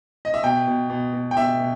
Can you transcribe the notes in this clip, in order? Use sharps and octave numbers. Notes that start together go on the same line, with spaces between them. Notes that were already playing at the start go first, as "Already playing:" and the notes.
D#5
E5
B2 G5
B2
B2
B2
G5
B2 E5
B2